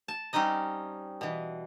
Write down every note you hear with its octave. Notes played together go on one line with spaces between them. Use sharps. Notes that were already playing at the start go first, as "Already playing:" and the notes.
A5
G3 C4 C#4 D#4 D#5
B2 E3